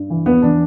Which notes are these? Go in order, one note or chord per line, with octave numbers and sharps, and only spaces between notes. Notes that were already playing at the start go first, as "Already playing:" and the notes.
Already playing: G2
E3
E2 B3
E3 D4